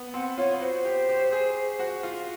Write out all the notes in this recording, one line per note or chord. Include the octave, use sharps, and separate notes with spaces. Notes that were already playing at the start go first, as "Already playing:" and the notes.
Already playing: B3
C4 F#5
F4 C#5
F#4 C5
G4
G4
G#4
F#4
F4